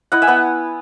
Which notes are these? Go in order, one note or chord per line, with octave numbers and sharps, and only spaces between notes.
E4 D#5 F#5
E5 G#5
B3 F#5